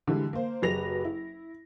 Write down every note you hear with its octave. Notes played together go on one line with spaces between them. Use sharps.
D3 E3 G3 G#3
A#3 C5
F#1 F#3 G4 B4 A#6 F7
E4